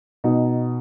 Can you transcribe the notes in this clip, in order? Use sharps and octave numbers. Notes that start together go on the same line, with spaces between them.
B2 D#4